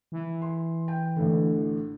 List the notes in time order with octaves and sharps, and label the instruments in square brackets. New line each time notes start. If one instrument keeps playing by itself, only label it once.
[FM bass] E3
[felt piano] C6
G5
A1 A2 D3